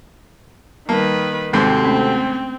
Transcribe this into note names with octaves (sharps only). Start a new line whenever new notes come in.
D#3 G3 A#3 B4 A5
D#2 G#2 C3 C4 F#4 A4
A3 C#4